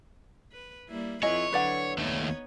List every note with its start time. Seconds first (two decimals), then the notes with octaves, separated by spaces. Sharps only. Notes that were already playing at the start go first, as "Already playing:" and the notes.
0.52 B4
0.89 G3 A#3 E4
1.23 F2 E4 F4 B4 C#5 D#5 G#5
1.53 D3 F#3 E4 B4 D5 F#5
1.98 D#2 A3 B3 D#4 C#5